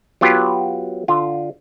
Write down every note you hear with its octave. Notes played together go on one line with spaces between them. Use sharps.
F#3 B3 F4 G4 B4
D3 F4